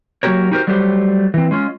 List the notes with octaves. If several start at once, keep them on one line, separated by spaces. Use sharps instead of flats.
F#3 A#3 F#4 G4 A#4 C#5
D#4 F#4 G4 A4 A#4 C5
F#3 G3 A3 G4 C5
E3 C4
G#3 C#4 F4